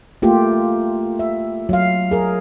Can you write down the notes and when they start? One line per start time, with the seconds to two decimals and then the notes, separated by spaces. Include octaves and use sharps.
0.22 A3 A#3 F4 G4
1.19 E5
1.69 F#3 F5
2.11 G#4 A#4